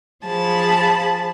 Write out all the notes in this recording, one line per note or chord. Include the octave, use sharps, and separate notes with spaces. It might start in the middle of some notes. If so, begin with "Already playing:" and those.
F3 G#4 A5 B5